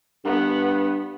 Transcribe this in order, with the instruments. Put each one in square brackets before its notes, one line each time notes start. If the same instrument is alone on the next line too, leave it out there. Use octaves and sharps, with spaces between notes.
[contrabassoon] G2 [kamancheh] B3